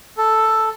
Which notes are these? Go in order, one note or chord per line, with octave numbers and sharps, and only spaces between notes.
A4